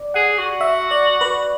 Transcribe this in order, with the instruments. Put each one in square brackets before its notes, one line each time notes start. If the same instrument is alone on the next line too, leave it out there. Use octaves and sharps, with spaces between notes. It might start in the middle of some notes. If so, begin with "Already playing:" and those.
Already playing: [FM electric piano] D5
[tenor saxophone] G#4 [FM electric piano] F#5
[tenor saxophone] F#4
[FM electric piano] E5
D5
B4